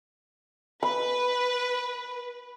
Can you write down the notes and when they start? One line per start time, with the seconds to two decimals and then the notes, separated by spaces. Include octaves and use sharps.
0.83 B4 B5